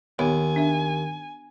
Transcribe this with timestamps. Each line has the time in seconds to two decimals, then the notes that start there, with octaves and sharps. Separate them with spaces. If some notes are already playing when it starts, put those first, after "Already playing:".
0.19 D#2 B3 C#5 G#5
0.56 D4 E5